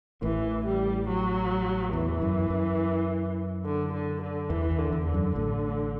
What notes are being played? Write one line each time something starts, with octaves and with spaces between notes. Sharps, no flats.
A1 A2 E3
G3
F#3
E2 E3
F#2
F#2
D3
D3
D3
E2 E3
E2
D3
E2
D3
F#2
A1 A2